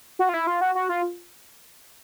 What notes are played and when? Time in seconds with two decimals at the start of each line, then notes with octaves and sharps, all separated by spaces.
0.19 F#4
0.29 F4
0.34 E4
0.47 F4
0.61 F#4
0.75 F#4
0.89 F4